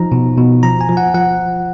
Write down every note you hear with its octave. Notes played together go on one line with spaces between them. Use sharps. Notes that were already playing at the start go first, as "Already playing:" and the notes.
Already playing: F3 D#4 A#5
B2
B2
F3 A#5
G#5
F3
F#5
F3 F#5